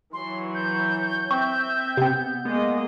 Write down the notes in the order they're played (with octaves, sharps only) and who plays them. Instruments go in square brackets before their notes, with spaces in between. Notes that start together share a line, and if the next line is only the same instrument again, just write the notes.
[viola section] E3 F#3 C#5 [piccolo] C6
[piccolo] G6
[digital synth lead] C4 [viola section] E5 [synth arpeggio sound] C#6
[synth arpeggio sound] C3 C4 [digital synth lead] B3
[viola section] G#3 A#3 D#5 [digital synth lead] B3